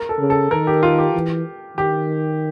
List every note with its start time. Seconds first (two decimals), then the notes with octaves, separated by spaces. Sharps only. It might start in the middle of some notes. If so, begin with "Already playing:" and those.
Already playing: A#4
0.09 A4
0.19 C#3
0.30 A4
0.51 D#3 A#4
0.67 G4
0.83 F4
0.99 G4
1.14 E3
1.77 D#3 G4